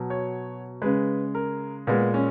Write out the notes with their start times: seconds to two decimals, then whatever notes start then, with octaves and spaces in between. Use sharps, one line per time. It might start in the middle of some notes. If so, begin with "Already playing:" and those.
Already playing: B2 F#3
0.10 C#5
0.82 C#3 G#3 B4
1.35 A#4
1.87 A#2 G#3 B3
2.14 C#4